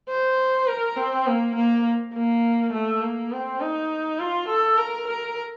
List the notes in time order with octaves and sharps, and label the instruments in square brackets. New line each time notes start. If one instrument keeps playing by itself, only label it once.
[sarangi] C5
A#4
C4
A#3
A#3
A#3
A3
A#3
C4
D#4
F4
A4
A#4
A#4